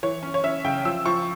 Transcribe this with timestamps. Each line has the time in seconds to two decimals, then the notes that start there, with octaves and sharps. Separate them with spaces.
0.03 E3 C#5
0.23 C#4
0.34 C#5
0.44 C#4 E5
0.64 C#3 G5
0.85 F3 E6
1.05 F3 C#6